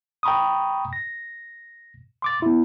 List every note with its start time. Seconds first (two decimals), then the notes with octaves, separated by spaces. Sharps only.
0.23 G5 A#5 B5 C#6 D#6
0.93 A#6
2.22 C6 D6 A6
2.42 B3 E4